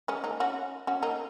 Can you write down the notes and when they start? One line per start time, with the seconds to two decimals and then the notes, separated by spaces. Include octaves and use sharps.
0.08 G#3 C#4
0.24 A#3 D#4
0.40 C#4 F#4
0.87 C#4 F#4
1.02 A#3 D#4